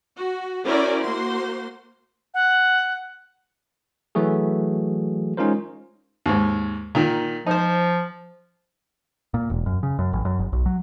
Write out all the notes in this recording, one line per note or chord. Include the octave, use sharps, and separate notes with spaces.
F#4
C#4 E4 F#4 A#4 C5 D5
A#3 F#4 C5 C6
F#5
E3 F#3 A3 F#4 G#4
G#3 C#4 D#4 F4 A#4 C5
D#2 G#2
A#2 D#3
F3 D#4 C5
A#2
E1
F#2
C#3
F#2
A1
F#2
G1
B1
F#3